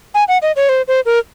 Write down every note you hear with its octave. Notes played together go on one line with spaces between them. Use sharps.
G#5
F#5
D#5
C#5
C5
C5
A#4